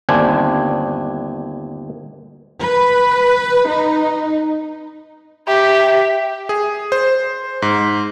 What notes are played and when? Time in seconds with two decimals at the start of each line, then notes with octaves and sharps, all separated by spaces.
0.09 G1 D#2 C4 D4 G#5
2.61 B4
3.67 D#4
5.47 G4 E5
6.49 G#4
6.92 C5
7.62 G#2